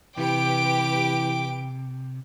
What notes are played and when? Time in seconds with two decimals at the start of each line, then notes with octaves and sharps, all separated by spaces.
0.17 C3 E3 G4 B4 G5 D6 D7